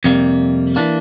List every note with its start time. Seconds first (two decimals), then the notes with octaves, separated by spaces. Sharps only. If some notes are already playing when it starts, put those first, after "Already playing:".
0.04 F2 C3 G3 A#3
0.76 E3 A#3 D4